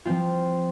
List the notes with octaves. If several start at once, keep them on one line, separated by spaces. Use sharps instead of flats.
F3 C4 F4